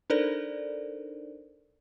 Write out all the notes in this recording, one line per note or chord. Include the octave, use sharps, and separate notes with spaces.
D4 D#4 A4 A#4 C5 D5